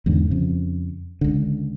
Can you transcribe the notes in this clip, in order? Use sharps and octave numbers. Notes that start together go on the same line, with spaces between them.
E2 G#2 D3
F2 C#3
C#2 D3